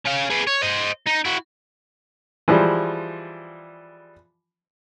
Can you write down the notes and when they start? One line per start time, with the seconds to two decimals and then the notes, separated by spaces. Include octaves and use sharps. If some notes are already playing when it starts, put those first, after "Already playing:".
0.05 C#4 F5
0.30 G#4 B4
0.47 C#5
0.62 C5 D#5
1.07 D#4
1.25 E4 F#4
2.48 E3 F3 G3 G#3